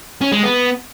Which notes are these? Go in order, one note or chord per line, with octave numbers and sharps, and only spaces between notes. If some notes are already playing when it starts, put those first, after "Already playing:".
C#4
G#3
B3